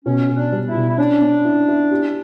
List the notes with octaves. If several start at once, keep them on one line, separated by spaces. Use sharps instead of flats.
B2 C#4
B2
D4
G3
E4
B2
E4
C#4 D4
C#4
E4
E4
G4